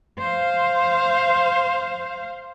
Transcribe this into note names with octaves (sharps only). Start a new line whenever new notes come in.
C5 F5